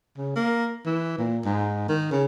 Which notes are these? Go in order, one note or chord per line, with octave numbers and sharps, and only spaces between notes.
C#3
A#3
E3
A#2
G#2
D#3
C#3